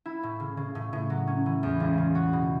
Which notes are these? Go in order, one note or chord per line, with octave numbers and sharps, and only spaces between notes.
E4
A2
C#3
C#3
A2
A2
F#3
C#4
E3
E2
C#2
C#3
F#4
B2